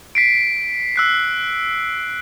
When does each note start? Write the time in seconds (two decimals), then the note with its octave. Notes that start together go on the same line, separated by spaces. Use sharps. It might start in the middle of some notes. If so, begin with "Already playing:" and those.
0.15 B6 C7 D7
0.96 E6 F#6 C7